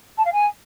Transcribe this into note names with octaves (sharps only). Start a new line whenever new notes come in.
A5
F5
G#5